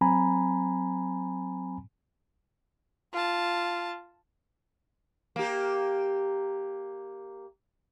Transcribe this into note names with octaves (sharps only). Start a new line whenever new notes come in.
F#3 C4 G#5 A#5 B5
F4 A5
A#3 G4